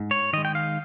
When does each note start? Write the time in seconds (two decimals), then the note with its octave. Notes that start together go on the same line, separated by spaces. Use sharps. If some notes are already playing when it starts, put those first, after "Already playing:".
Already playing: G#2
0.11 C#5
0.33 D#3 G#3 D#5
0.45 G5
0.55 F5